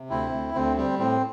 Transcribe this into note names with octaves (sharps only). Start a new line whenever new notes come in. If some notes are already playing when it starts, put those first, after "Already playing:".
Already playing: C3
D2 C4 E4
D2
D2 C4
G3 C4
A2 C4